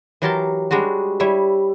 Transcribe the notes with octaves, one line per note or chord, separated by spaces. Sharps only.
E3 F#3 G4 A#4 A5 C6
G3 G#3 D4 F#4
G3 E4 C#5 E5